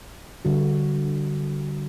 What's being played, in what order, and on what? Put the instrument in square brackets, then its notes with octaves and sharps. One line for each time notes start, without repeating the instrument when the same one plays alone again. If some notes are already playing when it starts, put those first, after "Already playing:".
[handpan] D3 G3 F#4